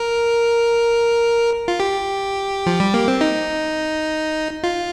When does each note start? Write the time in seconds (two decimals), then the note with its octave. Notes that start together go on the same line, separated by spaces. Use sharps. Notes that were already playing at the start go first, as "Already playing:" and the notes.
Already playing: A#4
1.68 F4
1.80 G4
2.66 F3
2.80 G3
2.94 A#3
3.08 C4
3.21 D#4
4.63 F4